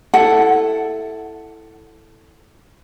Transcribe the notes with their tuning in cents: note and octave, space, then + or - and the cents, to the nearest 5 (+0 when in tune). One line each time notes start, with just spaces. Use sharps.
E4 +0 A4 +0 F#5 +0